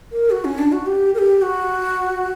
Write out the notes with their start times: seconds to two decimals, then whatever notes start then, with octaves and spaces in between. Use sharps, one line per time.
0.12 A#4
0.31 F#4
0.45 C#4
0.58 D4
0.72 F#4
0.86 G4
1.14 A#4
1.19 G4
1.42 F#4